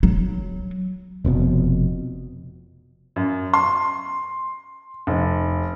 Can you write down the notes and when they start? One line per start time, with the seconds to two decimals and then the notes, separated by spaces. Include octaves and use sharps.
0.03 F#3
1.25 F1 F2 B2
3.16 F#2
3.53 C6
5.07 F1